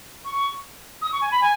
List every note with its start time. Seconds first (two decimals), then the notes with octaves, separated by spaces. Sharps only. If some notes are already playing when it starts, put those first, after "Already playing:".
0.24 C#6
1.02 D#6
1.12 C#6
1.21 G#5
1.31 B5
1.41 G#5